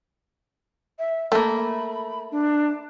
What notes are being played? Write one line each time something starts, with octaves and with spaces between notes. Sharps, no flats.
E5
A3 A#3 B5
D4